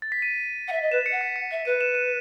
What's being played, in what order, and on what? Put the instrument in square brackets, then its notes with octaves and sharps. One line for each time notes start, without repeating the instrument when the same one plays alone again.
[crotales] A6
B6
D#7
[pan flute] F#5
E5
D#5
[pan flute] B4 [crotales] E7
[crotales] C#7
[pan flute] F#5
[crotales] B6
C#7
[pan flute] E5 [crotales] B6
[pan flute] B4 [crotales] D#7
[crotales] E7
D#7